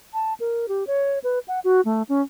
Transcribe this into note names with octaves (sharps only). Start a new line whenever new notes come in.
A5
A#4
G4
C#5
B4
F#5
F#4
A3
C#4